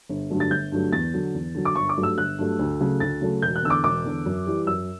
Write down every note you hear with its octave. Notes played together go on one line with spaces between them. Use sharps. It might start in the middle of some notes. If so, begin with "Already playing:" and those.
G1
G2 D3 F#3 A3
A6
G1 G6
G2 D3 F#3 A3
E2 A6
D3 F#3
E2
D3 F#3
D6
G1 C#6
D6
G2 F#3 A3
E6
G1 F#6
G2 F#3 A3
D2
C#3 F#3 A3
D2 A6
C#3 F#3 A3
E1 G6
F#6
E2 D3 E6
D6
E1 D6
E2 D3
F#2
E3 G3
F#2 E6